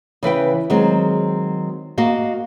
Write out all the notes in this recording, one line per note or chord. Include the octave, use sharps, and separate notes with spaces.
C#3 E3 B4 G5
D#3 F#3 G#3 C4
A#3 F#4 D#5 F5